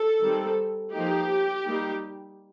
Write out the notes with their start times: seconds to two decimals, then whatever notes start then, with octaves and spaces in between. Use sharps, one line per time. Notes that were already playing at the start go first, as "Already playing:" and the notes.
Already playing: A4
0.21 D#3 G3 C4
0.93 F3 A#3 D#4 G4
1.64 G3 A#3 D#4